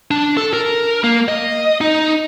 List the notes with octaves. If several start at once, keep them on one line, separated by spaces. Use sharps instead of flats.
D4
A4
A#4
A#3
D#5
D#4